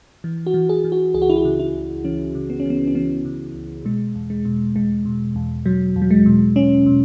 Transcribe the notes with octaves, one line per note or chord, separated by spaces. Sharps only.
E3
F#4
E3
G#4
E3
F#4
C#2 G#4
F#4
E4
F#4
C#3
E4
C#2
E3 C#4
C#3
B3
C#4
E3
B3
C#4
E3 B3
C#3
C#2
B2 G#3
E2
G#3
B2
E2 G#3
B2
E2
B2 F#3
E2
F#3
G#3
B2
B2 C#4
B2